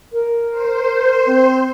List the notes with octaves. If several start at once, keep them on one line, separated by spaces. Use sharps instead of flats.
A#4
C5
C4